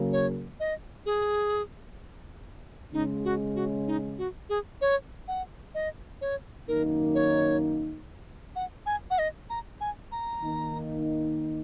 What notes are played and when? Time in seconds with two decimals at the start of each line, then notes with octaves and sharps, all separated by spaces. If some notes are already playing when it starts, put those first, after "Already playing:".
Already playing: C#3 F#3 A#3
0.13 C#5
0.60 D#5
1.06 G#4
2.93 C#3 G#3 C#4 D#4
3.25 F#4
3.55 F#4
3.87 D#4
4.18 F#4
4.49 G#4
4.81 C#5
5.28 F#5
5.75 D#5
6.21 C#5
6.68 F#2 D#3 A#3 D#4 A#4
7.15 C#5
8.56 F#5
8.86 G#5
9.11 F#5
9.19 D#5
9.50 A#5
9.81 G#5
10.12 A#5
10.42 D#3 A#3 D#4